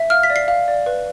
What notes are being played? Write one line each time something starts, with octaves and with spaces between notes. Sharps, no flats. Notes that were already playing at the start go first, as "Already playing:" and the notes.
Already playing: E5
F5 F6
B6
D5
C7
F5
D5
B4